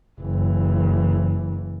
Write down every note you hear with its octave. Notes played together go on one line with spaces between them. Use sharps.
F#1 E3